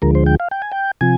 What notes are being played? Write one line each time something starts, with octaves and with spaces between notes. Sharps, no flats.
D2 D3 F3 G#3 A#4
C5
G5
F5
G5
G#5
G5
C3 F3 G#5